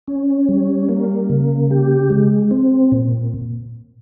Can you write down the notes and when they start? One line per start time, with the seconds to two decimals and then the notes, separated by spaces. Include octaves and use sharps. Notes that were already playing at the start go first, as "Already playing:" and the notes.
0.08 C#4
0.49 G3
0.89 A#3
1.30 C#3
1.71 G4
2.10 G#3
2.51 C4
2.92 A#2